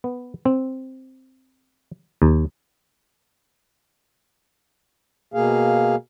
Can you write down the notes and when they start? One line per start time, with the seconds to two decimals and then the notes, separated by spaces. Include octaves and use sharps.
0.04 B3
0.45 C4
2.22 D#2
5.34 B2 A#3 G#4 F5